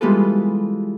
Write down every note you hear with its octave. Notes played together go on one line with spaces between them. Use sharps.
E3 G3 G#3 B3 F4 A4